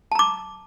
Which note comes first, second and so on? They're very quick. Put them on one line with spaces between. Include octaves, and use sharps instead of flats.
A5 A#5 D6